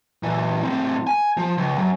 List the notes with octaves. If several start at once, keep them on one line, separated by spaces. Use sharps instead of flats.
A#2 E3
A2 C4
G#5
F3
C#2
F#2